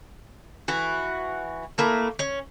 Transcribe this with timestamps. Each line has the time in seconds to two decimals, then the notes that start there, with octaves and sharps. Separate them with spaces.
0.68 E3 F#4
1.78 A3 A#3 E4
2.19 C#4